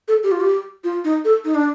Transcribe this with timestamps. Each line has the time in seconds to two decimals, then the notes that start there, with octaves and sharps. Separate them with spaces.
0.08 A4
0.23 G4
0.32 F4
0.41 G4
0.84 F4
1.04 D#4
1.25 A4
1.45 D#4
1.55 D4